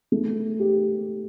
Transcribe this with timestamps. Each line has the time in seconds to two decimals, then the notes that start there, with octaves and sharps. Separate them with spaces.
0.12 A3
0.60 G4